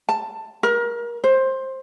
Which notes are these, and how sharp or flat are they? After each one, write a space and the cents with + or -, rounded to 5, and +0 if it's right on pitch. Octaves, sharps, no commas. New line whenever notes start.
A5 +10
A#4 +30
C5 +15